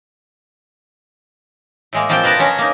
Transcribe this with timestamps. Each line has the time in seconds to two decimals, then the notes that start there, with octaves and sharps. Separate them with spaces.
1.93 A2 G#3 A#3
2.09 F3 A#3 C4 F4 G5
2.24 B2 B3 A#4 A5 A#5
2.39 F#3 C#4 A#5
2.58 A#3 D#4